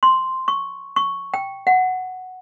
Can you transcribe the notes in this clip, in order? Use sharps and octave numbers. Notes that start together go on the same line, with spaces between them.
C6
C#6
C#6
G5
F#5